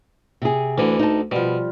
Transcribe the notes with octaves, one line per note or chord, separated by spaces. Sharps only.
C3 G#4
D2 D3 E3
D#4 A5
B2 F3 G3